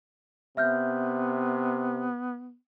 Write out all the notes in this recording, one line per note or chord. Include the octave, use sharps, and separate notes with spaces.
C3 B3 E5 F6 G6